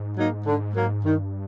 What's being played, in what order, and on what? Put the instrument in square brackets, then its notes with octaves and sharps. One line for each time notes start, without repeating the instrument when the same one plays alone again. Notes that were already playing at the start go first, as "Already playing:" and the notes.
Already playing: [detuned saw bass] G#2
[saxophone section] F#3 A#3 D#4
D3
F#3 A#3
[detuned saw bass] G2 [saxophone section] D#3